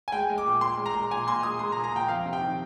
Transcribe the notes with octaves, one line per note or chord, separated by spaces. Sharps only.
G#5
G#3 G5
G#3
D6
A#2
A#2 C6
G#3
A#5
G#3
A#2 G#5
A#2 C6
G#3 D#6
G#3 C6
A#5
A#2
A#5
A#2 G5
F2 F5
C3
G5
D#3